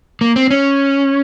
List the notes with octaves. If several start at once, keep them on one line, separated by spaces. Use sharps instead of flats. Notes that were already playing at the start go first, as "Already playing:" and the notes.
A#3
C4
C#4